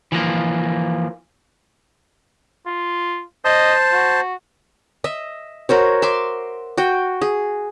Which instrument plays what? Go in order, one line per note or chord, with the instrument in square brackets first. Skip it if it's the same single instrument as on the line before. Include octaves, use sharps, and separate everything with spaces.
[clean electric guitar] E3 F3 A#3
[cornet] F4
[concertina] C5 A5 [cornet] D#5
[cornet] F#4
[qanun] D#5 E5
F#4 A#4 C5 C#5
E5 C6 D6
F#4 G5
G#4